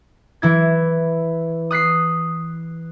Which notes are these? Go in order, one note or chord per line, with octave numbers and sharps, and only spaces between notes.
E3 E4 G#6
D#6 F#6 B6 C7